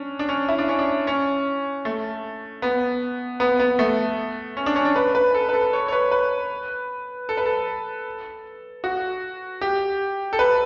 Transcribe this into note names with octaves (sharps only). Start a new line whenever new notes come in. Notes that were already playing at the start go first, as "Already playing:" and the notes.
Already playing: C#4 D4
D4
C#4
E4
D4
C#4
D4
C#4
A3
B3
B3
B3
A3
C#4
D4
C#4
D4
B4
B4
A4
B4
A4
C#5
C#5
B4
B4
A4
B4
A4
F#4
G4
A4
B4